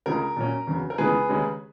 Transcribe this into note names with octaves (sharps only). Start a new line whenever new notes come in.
C#2 C#3 G#3 A#4
A#2 F#3 C#4
E2 C#3 F#3
A#4
C#2 C#3 E3 G#3 B3 G#4 B4
D#2 C#3 G#3 C#4